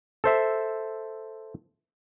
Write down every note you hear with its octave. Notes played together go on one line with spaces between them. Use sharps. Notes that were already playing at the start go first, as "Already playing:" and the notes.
A4 C5 E5